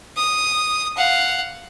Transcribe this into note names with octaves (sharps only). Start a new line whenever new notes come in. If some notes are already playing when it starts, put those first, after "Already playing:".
D#6
F5 F#5